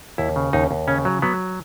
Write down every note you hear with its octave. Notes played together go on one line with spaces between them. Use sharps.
D#2 E4
C#3
D#2 D#4
D#2
C#3 C#4
F#3
F#3 B3